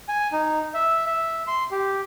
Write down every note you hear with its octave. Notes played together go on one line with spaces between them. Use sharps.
G#5
D#4
E5
E5
C6
G4